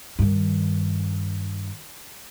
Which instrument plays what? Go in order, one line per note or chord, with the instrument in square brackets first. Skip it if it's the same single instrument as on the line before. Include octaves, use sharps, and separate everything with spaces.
[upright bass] G2 D#3